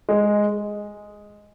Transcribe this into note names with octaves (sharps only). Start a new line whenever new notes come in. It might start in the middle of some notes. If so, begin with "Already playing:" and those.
G#3